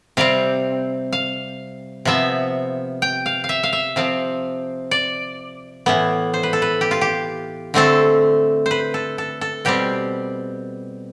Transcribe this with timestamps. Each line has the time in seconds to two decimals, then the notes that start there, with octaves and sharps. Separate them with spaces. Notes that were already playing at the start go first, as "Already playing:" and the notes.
0.17 C3 G3 C4 F5
1.13 F5
2.05 C3 F3 B3 E5
3.02 G5
3.26 F5
3.44 F5
3.49 E5
3.63 F5
3.73 E5
3.96 C3 F3 C4 F5
4.91 D5
5.86 A2 E3 B3
6.34 C5
6.43 B4
6.53 A4
6.62 B4
6.81 G4
6.91 F4
7.01 G4
7.74 D3 A3 C4 A4
8.66 C5
8.71 B4
8.94 A4
9.18 A4
9.41 A4
9.65 B2 G3 C4 G4